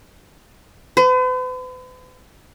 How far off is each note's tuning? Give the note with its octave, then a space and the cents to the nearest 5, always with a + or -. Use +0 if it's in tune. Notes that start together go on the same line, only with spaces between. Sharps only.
B4 +45